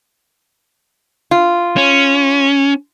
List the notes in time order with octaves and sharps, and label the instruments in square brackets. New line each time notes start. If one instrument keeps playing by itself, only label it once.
[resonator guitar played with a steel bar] F4
[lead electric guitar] C#4